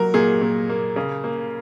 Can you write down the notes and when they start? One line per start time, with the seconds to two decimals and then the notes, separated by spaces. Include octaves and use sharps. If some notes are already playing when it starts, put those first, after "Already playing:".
Already playing: F#3 A#3 A#4
0.14 A#2 G#4
0.42 A#2
0.69 A#3
0.96 C#3
1.24 A#3